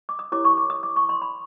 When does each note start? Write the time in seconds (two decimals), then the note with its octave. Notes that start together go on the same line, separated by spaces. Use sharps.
0.09 D6
0.19 D#6
0.32 E4 G4 A#4 C#5 D6
0.45 C#6
0.57 D6
0.70 D#6
0.83 D6
0.96 C#6
1.09 C6
1.22 B5